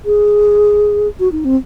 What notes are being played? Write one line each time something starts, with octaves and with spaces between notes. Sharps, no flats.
G#4
F#4
D#4
C4